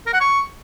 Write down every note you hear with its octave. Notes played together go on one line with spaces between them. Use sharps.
A#4
F#5
C#6